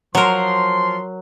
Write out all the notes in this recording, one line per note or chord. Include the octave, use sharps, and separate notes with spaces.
F3 F#3 A#4 C6